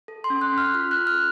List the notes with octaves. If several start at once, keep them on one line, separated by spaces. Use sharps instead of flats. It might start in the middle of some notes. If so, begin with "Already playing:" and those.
A4
C6
C#4
F#6
C#4
F6
F4 F6
F#6
A4
F6